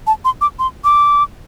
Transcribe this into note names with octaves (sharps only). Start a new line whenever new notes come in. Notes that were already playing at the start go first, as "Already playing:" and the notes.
A5
C6
D6
C6
D6